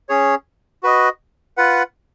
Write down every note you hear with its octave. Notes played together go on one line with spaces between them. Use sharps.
C#4 G#4 C#5
F#4 B4 D#5
F4 B4 F#5